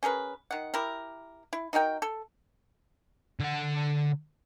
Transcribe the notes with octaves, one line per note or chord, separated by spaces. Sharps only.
C#4 G#4 A#4 B4
D#3 F#5
E4 G4 A#4
E4
D#4 F#4 A#4 G5
A4
D3 F#5